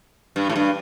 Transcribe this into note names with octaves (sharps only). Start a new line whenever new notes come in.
G2
A2
G2